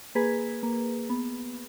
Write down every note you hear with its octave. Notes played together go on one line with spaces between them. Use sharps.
A#3 G#4 B4
A#3
B3